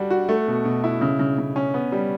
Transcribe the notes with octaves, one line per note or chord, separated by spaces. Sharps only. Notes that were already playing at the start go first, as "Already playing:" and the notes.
Already playing: G3 D4 F#4
F#4
A3
B2
B2
E4
C#3
C#3
C#3
C#4
B3
G3